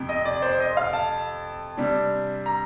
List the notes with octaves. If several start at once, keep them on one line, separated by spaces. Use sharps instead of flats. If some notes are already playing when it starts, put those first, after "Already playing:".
Already playing: F2 C3
D#5
D5
C5
D#5
F5
A5
C3 G3 D4
A#5